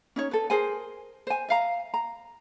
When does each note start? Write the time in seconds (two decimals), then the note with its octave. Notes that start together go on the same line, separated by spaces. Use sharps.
0.16 C#4 D#4 C#5
0.31 A4 B4
0.50 G#4 A#4 C5 G#5
1.27 C5 G#5
1.49 E5 F5 A#5
1.94 A#5